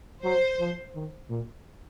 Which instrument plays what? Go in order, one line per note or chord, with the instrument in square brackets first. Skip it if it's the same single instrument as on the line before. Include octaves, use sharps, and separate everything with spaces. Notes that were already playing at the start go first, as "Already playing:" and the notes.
[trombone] F#3 [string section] C5
[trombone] F3
D#3
A#2